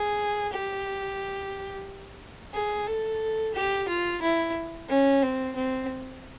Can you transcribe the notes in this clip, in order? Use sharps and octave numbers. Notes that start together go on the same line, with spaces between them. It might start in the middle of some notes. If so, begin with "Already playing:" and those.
Already playing: G#4
G4
G#4
A4
G4
F4
E4
C#4
C4
C4